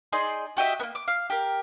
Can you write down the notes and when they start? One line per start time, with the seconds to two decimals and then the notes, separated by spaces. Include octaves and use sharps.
0.12 D#4 G#4 D5 C6
0.57 F#4 G4 D#5 E5
0.80 A#3 B3
0.95 D6
1.08 F5
1.30 G4 A#4